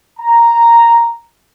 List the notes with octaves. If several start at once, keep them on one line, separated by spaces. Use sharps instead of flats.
A#5